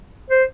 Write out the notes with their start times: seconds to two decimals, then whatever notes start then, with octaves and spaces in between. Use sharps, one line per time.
0.30 C5